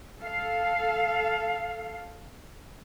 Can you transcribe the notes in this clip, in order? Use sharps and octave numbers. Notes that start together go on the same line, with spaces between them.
A4 F5